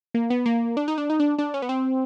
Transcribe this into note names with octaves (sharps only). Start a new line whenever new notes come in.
A#3
B3
A#3
D4
D#4
D4
D#4
D4
D4
C#4
B3
C4